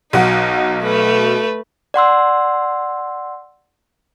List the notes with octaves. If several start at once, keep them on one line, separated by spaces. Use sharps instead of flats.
B1 F#3 D#4 F#5
A3 B4
D5 F#5 C6 E6